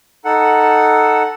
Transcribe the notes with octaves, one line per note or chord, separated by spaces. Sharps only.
D#4 A4 F#5